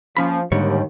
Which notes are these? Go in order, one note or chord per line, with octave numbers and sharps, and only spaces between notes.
F3 A#3 C#4 B5
D#2 G#2 D3 G3 C#5